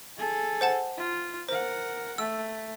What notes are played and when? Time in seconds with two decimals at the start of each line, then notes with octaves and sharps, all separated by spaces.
0.17 G#4 A4
0.61 C5 F#5 A5
0.97 F4
1.49 A#4 C5 F#5
2.18 A3 E6